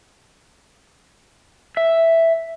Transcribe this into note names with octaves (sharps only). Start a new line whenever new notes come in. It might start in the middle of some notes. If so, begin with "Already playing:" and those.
E5